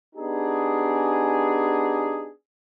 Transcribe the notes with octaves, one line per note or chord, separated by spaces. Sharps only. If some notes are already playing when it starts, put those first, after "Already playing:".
B3 D4 D#4 G4 G#4